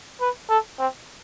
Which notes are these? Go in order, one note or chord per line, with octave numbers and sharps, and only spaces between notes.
B4
A4
C4